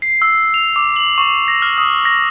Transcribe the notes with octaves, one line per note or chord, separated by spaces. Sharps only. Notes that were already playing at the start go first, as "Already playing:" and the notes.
C7
E6
F7
D6
F#7
C#6
A#6
F6
D#6
A#6